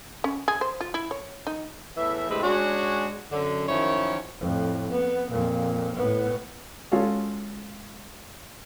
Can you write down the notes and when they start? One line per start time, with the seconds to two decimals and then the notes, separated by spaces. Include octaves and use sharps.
0.24 C#4
0.48 G#4
0.61 C5
0.81 F4
0.94 E4
1.11 C#5
1.47 D#4
1.97 E2 A2 E3 E5
2.30 A2 C3 G#3 C4 D4 B4
2.43 G#3 C#4 D4 F#4
3.32 F#2 D3
3.68 F#2 D#3 F3 C#4 E4 C#5
4.40 F2 A2
4.91 B3
5.31 F2 A#2
5.95 A2 B3
6.92 G#3 C#4 F4 F#4 A4 F5